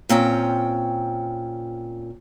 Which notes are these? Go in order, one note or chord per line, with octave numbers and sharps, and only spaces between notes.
A#2 C4 C#4 G5